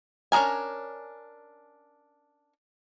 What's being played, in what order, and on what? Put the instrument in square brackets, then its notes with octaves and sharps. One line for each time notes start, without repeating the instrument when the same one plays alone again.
[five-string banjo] C#4 D4 G#4 A#4 G#5